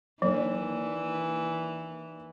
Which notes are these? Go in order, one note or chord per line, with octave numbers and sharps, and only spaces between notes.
D#2 E3 F#3 A#3 D4